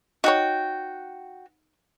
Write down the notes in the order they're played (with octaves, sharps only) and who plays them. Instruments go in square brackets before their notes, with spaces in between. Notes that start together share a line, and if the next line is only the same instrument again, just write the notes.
[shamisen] D#4 C#5 [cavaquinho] F#4 G5